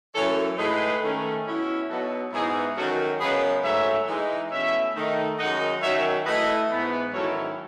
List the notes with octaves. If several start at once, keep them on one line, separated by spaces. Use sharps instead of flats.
F#2 E3 A3 A4 C#5
A2 G#3 D#4 G#4 B4
D#3 A3 C#4
B2 F#3 C#4 E4
B2 F#3 B3 D#4 F#4 A4
G#2 E3 B3 D#4 E4 G#4
F#2 D#3 F#3 C#4 F#4 A4
F#2 C#3 G#3 B3 G#4 B4
G#2 F#3 A3 C#5 E5
E3 G#3 D#4
B2 A3 C#4 E4 C#5 E5
D#3 A3 D#4
F#2 D#3 G#3 D#4 D#5 F#5
F#2 D#3 F#3 C#5 E5
E3 A3 E4 B4 D#5
G#2 E3 B3
G#2 D#3 F#3 C#4 E4 A4 C#5